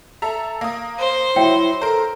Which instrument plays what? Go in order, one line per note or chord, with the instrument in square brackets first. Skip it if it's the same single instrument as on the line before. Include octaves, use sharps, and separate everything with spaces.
[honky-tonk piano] A4 E5 A#5
A#3 D#6
[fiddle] C5
[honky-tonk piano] F#3 [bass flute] E4 [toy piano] C#5 E5 G5
[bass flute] A4 [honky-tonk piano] A#4 C5 [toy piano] A#5